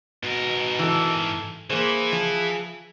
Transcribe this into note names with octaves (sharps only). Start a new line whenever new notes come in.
G#2 B2 A#4
E3 A4
E3 A#3 E4 G#4 C5
F3